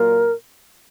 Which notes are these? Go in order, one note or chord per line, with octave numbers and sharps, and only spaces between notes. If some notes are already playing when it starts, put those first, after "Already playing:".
Already playing: A#2 F#3 A#3 F4 A#4